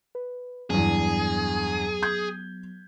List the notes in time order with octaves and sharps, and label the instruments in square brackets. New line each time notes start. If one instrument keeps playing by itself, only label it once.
[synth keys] B4
[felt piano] E2 G2 [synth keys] F#3 B3 [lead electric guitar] G#4
[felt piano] G6 G#6